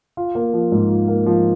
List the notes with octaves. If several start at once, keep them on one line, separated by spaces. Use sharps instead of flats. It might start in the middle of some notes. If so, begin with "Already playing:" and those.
F4
A#3
F3
G#2
F4
A#3
F3